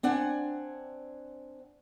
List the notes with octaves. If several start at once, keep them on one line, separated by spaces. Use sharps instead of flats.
C4 D4 F#5 G#5